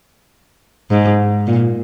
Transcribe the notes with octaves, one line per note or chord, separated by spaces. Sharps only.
G#2
A#2